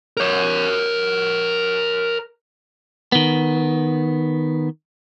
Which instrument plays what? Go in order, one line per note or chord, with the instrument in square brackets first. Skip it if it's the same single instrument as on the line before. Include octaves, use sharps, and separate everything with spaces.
[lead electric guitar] A#4 C#5
[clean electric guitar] D#3 B3